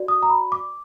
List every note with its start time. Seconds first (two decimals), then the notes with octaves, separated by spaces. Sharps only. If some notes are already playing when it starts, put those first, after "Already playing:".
Already playing: F#4 D5
0.08 D#6
0.23 A#5
0.30 B5
0.52 D6